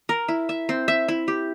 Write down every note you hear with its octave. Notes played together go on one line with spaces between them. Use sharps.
A#4
E4
E5
C4
E5
E4
G4